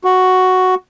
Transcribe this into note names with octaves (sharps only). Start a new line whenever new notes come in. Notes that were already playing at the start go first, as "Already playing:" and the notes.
F#4